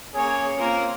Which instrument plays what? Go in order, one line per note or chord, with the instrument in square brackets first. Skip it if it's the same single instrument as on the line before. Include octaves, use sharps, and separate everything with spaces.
[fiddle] A#3 C#5 [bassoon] C#4 [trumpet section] G#4
[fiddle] A#3 A#4 [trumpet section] C4 F4